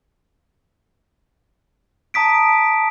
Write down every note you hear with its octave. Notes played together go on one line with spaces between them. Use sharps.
A5 A#5 D#6 B6 D7